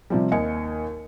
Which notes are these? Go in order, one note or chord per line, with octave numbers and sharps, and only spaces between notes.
C3 F3 G3
D#2 D#5 G#5 C#7